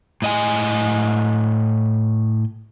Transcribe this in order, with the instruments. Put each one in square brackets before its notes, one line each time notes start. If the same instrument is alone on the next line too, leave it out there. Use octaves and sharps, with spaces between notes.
[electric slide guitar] A2 D#5 G#5